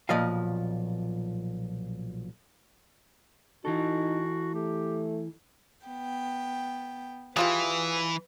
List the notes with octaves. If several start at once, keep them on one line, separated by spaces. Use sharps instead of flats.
B1 A#2 F3 D#5 F5
E3 D#4 F#4 A4
A3 G4
B3 G5
E3 G3 F4 G#4 B4